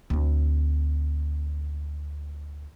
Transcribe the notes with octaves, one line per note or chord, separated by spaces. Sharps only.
D2 C4